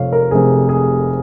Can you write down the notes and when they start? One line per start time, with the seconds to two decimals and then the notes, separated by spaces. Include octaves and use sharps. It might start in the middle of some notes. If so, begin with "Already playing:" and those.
Already playing: F1 F2 C3 C#5 F5
0.12 A#4
0.31 F1 F2 C3 G#4
0.69 G#4